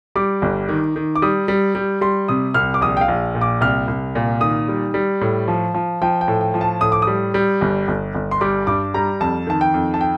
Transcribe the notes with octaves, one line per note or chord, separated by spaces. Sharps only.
G3 D6
G1
D#3
D#3
D6
G3 D#6
G3
G3
G3 C6
C3 D#6
C2 F6
D6
A#1 D#6
G5
F5
A#1
A#2
D6
C2 F6
C2
A#2
D#3 D#6
G3
G3
A2
F3
F3
F3 G5
G5
A2
G5
F3
A5
A2 D#6
D6
D#6
G3
G3
G1
G1
G1
C6
G3 D6
G2 D6
G3 A#5
F2 A5
D#3 A5
G5
F2
A5
G5